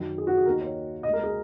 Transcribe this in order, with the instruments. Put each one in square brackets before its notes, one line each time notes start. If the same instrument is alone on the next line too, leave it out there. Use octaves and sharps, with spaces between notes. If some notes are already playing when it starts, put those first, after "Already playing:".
Already playing: [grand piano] F#2 D#3 F#3 D#4
G#4
F#4
G#4
D#2 D#3 A#3 D#4 A#4
C#5
D#2 C#3 G#3 D#5
A#4
G#4